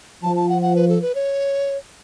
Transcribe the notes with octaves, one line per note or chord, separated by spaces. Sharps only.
F3 A5
A5
F#5
F#5
B4
A4
B4
C#5